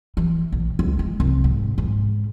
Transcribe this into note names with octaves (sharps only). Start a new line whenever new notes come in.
E3
A#1
C#2
G#3
C2
G#2
G#2